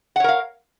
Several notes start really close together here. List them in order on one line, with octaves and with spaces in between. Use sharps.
F#5 C#5 A#4 F5